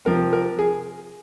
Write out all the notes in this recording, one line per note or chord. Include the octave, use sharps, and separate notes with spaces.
C3 F3 C4 A#4
A#4
G#4